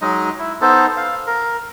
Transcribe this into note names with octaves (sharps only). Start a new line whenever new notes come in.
F#3 G#3 D#4 D#5
E4
B3 D#4 A4 C5
F5
A#4